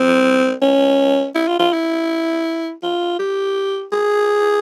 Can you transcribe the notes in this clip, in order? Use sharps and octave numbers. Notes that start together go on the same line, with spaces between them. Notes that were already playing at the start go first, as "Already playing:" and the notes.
Already playing: C4
C#4
E4
F4
F4
E4
F4
G4
G#4